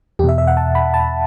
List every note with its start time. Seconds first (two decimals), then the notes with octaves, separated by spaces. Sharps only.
0.19 E2 G4
0.24 B2 E5
0.38 E5
0.47 F#5
0.57 A5
0.75 B5
0.94 A5